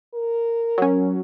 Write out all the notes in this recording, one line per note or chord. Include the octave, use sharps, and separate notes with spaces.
A#4
F#3 C#4